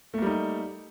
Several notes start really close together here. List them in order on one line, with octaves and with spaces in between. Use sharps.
A3 A#3 G3 D#4